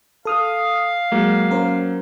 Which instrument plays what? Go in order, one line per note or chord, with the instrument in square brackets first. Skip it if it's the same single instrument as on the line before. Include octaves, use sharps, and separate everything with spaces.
[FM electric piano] A4 D#6 F6 [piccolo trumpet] F5
[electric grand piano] F#3 A#3 [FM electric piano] G#3
[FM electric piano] C#4 A#4 C5